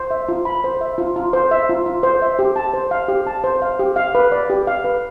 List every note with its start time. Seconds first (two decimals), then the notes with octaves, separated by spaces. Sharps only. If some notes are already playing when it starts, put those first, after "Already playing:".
Already playing: C5
0.11 E5
0.29 F4
0.45 B5
0.64 C5
0.81 E5
0.98 F4
1.16 F4
1.33 C5
1.51 E5
1.69 F4
1.86 F4
2.03 C5
2.22 E5
2.39 G4
2.56 A5
2.74 C5
2.91 F5
3.08 G4
3.27 A5
3.44 C5
3.62 F5
3.79 G4
3.96 F5
4.15 B4
4.32 D5
4.50 G4
4.67 F5
4.84 B4